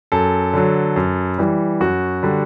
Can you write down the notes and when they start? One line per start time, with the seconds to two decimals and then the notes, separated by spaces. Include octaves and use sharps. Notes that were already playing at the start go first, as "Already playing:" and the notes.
0.12 F#2 A4
0.54 D3 F#3
0.96 F#2
1.38 E3 G3
1.81 F#2 F#4
2.23 D3 G3